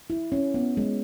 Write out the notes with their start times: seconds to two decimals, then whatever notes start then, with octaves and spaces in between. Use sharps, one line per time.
0.10 E4
0.32 C#4
0.54 B3
0.77 G#3